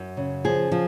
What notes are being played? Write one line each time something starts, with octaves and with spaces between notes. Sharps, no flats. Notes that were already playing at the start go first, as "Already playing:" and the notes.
Already playing: F#2
C#3
F3 G#4
F3